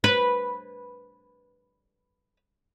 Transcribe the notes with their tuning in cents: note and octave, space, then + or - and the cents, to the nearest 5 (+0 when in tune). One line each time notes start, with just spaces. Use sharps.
B4 -5